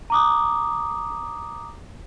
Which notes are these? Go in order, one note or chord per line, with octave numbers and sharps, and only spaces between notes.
A#5 D6 D#6